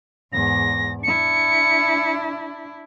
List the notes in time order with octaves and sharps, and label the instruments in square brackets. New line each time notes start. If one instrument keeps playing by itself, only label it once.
[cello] E2 G#2 [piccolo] A#6
[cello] D4 E4 [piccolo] C#7